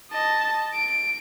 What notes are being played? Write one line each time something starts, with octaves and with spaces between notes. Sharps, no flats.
D#5 A5
D7